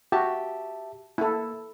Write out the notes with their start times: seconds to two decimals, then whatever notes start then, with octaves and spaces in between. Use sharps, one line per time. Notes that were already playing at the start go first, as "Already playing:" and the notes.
0.12 F#4 G4 E5 A5
1.18 A#3 E4 A4